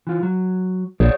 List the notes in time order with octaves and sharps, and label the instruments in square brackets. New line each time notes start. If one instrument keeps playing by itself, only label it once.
[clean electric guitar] E3 F4
F#3
[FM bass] A#1 [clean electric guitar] G#4 C#5 D5